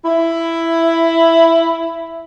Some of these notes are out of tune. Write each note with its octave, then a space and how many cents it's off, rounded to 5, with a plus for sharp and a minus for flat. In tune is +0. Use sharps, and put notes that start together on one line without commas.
E4 +5